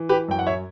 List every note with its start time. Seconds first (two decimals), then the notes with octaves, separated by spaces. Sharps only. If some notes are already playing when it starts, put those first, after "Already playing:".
Already playing: E3
0.09 G4 B4
0.28 F#2 G5
0.39 F#5
0.46 C#5 E5